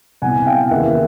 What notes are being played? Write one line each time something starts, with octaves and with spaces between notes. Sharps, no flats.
C2 B2 F#5 G#5
F5 G5
D#2 C#3 E3 E5 F#5